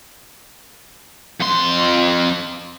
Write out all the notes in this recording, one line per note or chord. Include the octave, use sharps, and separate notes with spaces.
F2 C6